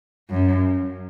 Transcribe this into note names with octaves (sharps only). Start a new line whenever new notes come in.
F#2